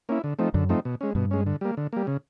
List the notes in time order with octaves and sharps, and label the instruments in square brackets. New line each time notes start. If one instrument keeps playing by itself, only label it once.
[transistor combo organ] A#3 C#4 E4
D3
F3 A3 C4 D#4
[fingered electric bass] F#2 [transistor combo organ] D3
[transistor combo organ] F3 A3 C4 D#4
B2
G#3 C#4
[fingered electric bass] G2 [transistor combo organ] B2
[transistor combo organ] G#3 C#4
D3
G3 A#3
D3
G3 A#3
C#3